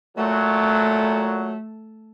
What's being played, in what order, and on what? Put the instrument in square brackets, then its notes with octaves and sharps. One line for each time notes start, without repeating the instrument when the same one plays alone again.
[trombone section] A#2 F#3 [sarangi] A3